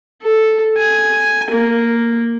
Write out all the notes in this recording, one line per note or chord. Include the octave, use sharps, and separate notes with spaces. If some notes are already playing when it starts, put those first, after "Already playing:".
A4
G#5
A#3